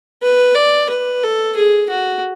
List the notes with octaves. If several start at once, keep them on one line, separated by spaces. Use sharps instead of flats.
B4
D5
B4
A4
G#4
F#4